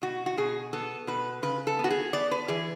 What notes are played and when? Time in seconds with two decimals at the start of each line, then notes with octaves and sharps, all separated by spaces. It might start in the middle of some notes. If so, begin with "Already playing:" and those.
0.02 B2 F#4
0.26 F#4
0.37 B2 G#4
0.73 B3 A4
1.07 B2 B4
1.43 C#3 B4
1.67 A4
1.79 B3
1.84 F#4
1.90 G#4
2.13 B3 D5
2.31 B4
2.48 E3 G#4